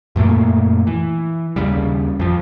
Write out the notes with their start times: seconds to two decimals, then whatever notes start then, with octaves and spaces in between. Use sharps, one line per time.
0.16 F#2 A#2 A3 A#3
0.87 E3
1.56 D#2 C#3 G3
2.20 F2 F3